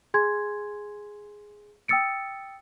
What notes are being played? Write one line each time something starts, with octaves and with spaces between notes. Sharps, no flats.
G#4 G#5 C6 G#6
G5 D#6 E6 A6 C#7 D7